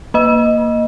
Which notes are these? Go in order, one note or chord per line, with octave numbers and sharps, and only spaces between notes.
A#3 D#5